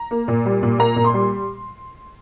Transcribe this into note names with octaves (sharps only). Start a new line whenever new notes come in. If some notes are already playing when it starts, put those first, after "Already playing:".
Already playing: A#5
A#3
A#2
G3
A#2
A#3 A#5
A#2
C6
G3